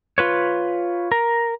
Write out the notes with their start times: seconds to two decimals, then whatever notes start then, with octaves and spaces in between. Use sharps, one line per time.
0.18 F4 B4 C#5
1.12 A#4